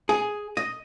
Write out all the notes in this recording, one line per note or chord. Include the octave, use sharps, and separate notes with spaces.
G#4
D#5